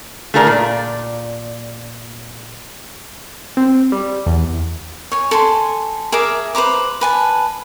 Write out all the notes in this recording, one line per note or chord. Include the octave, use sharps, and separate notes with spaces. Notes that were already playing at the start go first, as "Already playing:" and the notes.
A3 F4 G#4 A#4 C#5 D5
A#2 D5
C4
G3
E2
C#5 G#5
A4 G#5 C6
G#4 A#4 E5 D6
B4 C5 A#5 D6
B4 G#5 A5